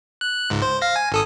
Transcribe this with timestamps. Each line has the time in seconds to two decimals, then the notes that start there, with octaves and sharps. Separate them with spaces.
0.21 F#6
0.50 C#2 G#2
0.62 C5
0.82 F5 A#6
0.96 G#5
1.12 G#1 A4 D#6